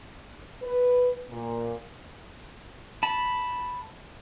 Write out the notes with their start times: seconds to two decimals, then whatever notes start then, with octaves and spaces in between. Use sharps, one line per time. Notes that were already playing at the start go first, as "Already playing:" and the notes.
0.62 B4
1.30 A#2
3.03 A5 B5